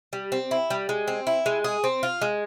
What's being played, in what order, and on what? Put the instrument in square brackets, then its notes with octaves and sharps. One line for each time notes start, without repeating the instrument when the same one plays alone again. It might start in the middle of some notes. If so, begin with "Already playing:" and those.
[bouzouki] G3
C4
E4
G3
G#3
C4
E4
G#3
G#4
C4
F4
G#3